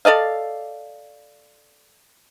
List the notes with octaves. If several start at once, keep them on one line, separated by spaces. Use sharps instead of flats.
A4 D5 D#5 F5